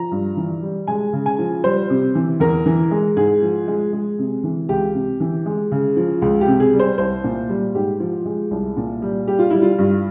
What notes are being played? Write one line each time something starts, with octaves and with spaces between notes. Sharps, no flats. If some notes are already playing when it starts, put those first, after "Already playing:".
Already playing: F3 A#5
G2
E3
G3
G#3 G#5
C#3
G#5
F3
G3 C5
C3
E3
E2 A#4
E3
G#3
G#2 G#4
F3
G#3
G#3
C3
E3
C#2 G4
C3
E3
G#3
C#3
F3
C#2
G4
C3
G#4
G3
C5
C2 C5
A#2
G3
G#2 G4
F3
G#3
C2
A#2
G3
G3 G4
F4
G3 E4
F4
G2